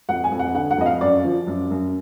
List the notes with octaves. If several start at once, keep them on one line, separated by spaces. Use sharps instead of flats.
F2 F#5
G#5
F2
F#5
D3 F#5
F#5
F2 D#5
F5
F#2 D5
F3
F#2
F#2